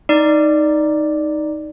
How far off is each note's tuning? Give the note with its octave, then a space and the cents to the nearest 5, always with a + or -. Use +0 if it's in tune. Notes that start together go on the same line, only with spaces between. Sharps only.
D#4 +0 D5 +0